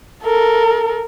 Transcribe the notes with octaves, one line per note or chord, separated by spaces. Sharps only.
A4 A#4